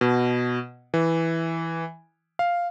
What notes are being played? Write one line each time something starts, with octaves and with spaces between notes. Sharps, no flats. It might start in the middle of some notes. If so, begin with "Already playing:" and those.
B2
E3
F5